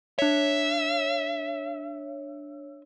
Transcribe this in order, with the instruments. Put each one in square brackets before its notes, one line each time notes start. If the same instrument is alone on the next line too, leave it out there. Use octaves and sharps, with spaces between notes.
[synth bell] D4 C#5 [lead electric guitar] E5